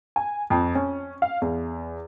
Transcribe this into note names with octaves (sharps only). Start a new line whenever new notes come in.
G#5
F2
C#4
F5
E2